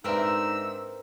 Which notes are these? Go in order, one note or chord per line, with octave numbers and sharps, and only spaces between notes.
G#2 C4 D4 D#4 A#4 B4 E5 E6